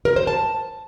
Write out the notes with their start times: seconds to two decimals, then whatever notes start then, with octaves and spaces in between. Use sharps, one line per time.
0.05 A#4
0.16 C5
0.27 A5